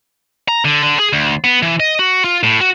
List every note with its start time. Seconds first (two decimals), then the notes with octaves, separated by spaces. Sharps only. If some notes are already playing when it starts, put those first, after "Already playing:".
0.48 A#5
0.65 D3
0.83 D3
0.99 G#4
1.13 D2
1.44 B3
1.63 E3
1.80 D#5
1.99 F#4
2.25 F4
2.43 A2
2.61 F#4